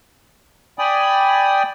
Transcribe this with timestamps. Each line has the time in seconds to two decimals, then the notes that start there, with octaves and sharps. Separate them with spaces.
0.79 D5 G5 G#5 B5 D#6